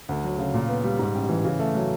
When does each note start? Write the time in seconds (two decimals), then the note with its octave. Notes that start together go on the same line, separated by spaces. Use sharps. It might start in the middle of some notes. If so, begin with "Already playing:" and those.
0.09 D2
0.24 F#3
0.39 C#3
0.54 A#2
0.69 B3
0.84 G3
0.99 G#2
1.14 A1
1.29 E3
1.45 C#3
1.59 A3
1.75 F#3